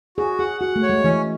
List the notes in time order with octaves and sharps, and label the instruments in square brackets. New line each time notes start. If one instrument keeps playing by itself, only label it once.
[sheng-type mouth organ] F#4 [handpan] G#4
[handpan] G#4 [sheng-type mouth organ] F#5
[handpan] F#4 [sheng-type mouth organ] F#5
[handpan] A3
[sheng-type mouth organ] C#5
[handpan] G#3
[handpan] E3 [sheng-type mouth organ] C#4